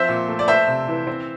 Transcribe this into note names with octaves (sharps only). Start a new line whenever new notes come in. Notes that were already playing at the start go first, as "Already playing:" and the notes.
Already playing: F3 C4 C5 E5
A#2
A3
D5
A3 C5 E5
C3
E3
C4